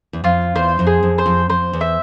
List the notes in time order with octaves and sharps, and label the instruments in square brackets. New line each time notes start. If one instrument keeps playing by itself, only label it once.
[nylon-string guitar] E2
[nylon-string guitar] F2 [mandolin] F4
[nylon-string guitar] E2 [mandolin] C5
[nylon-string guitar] F2
[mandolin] G#4
[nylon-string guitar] F2
[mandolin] C5
[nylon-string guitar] F2
[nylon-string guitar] F2 [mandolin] C5
[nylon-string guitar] E2
[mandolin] E5